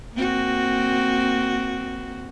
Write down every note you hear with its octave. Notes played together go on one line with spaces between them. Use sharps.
A#3 C4 F#4